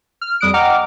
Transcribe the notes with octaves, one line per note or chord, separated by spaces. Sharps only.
F6
F2 G3 D#6 F#6 D7
D#5 F#5 G5 A#5 D6 F6